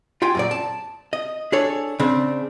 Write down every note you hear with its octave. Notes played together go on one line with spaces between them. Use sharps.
F4 G4 G5 G#5
F#2 A#2 D5
A5
D#5
D4 G#4 A4 C#5
C#3 C4 D4